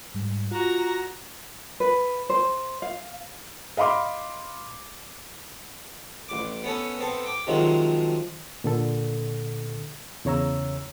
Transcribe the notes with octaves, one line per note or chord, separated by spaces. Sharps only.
G#2 G3
F4 F#4 A#5 A#6
B4
C5
F5
D#5 F5 B5 C6 D6
A1 D6
B3 C#4 A4
B3 C4 A4
G5 D6
C3 D#3 F3 F#3 G#3
A#2 D3 A4
E2 C#3 C#5 A#5 E6